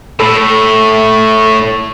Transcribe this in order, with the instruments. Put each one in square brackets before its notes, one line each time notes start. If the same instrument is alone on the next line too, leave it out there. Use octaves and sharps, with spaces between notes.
[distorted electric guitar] A2 [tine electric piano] A4 B5